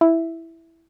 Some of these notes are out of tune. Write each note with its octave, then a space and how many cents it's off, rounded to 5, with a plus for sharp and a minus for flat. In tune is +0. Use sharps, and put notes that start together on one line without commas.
E4 +0 E5 +0